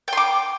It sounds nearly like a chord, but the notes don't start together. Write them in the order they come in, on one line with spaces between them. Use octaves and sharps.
G5 C6 D6